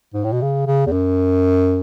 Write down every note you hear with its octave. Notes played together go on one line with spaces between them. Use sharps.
G#2
A2
B2
C#3
C#3
E2
F#2